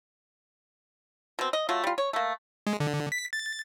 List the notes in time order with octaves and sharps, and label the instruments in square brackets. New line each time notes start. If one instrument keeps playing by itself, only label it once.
[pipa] B2 C4
D#5
F#3 A3 F4
G3 F4
C#5
A3 A#3
[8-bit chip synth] G#3
D3
B6
A6